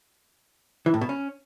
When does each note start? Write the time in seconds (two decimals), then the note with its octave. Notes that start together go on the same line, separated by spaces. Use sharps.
0.86 E3
0.94 A2
1.01 B2
1.09 C#4